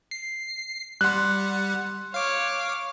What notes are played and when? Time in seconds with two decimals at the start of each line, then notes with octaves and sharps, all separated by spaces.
0.11 C7
1.01 G3 F#5 C6 F#6
2.14 C#5 F5 D6